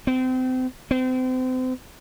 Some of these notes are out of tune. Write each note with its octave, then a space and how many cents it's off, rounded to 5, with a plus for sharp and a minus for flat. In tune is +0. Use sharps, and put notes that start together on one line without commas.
C4 -30
C4 -35